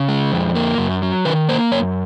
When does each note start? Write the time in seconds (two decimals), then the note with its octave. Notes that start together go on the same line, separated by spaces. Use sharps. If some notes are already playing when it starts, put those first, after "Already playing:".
Already playing: C#3
0.09 G#3
0.32 F2
0.55 A#3
0.78 F#2
1.02 F#3
1.25 D#3 B4
1.48 A#3 C5
1.72 F#2 C#5